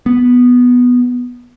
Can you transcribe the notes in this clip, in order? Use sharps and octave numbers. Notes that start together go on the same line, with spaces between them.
B3